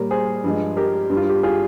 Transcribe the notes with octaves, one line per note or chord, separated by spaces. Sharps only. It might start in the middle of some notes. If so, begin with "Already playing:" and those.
Already playing: A#2 G3 A#4 C#5
G#4 C5
G2 F3 G#3
G4 A#4
G2 G3
F4
G4
F4 G#4